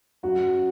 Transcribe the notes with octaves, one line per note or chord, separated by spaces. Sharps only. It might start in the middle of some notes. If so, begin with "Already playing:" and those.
F#2 F#4